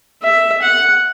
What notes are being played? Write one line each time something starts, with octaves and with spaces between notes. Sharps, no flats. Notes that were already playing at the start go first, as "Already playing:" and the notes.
E5
F#5